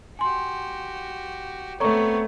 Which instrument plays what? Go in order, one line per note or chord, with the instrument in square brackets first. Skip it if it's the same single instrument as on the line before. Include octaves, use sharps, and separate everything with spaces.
[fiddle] F#4 G4 [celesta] G#5 C6
[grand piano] A3 C#5 [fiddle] B3 C4 [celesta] A4 A#5 C#6